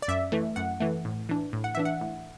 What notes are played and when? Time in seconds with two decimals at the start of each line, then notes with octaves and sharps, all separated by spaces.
0.02 D5
0.08 F#2 E5
0.32 E3 A3
0.56 F#2 F#5
0.80 E3 A3
1.05 A2
1.29 E3 D4
1.53 A2
1.64 F#5
1.75 E3 D4 E5
1.85 F#5
2.01 A2